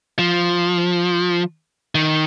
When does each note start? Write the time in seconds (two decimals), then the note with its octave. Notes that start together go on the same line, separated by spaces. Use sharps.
0.19 F3
1.95 D#3